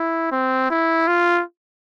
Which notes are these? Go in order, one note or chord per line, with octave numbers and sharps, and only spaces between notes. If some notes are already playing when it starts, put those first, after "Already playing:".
Already playing: E4
C4
E4
F4